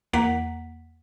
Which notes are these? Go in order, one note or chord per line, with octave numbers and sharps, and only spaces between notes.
E2 A#3 F#5 B6